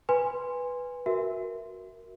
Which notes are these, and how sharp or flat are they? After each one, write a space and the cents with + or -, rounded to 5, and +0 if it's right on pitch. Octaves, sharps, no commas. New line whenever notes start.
B4 +0 G#5 -20 C6 +0
F#4 +0 A#4 +0 E5 +0